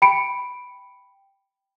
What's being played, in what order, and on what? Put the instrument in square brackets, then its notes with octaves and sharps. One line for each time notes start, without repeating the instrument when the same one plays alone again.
[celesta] G5 B5 C#7 D7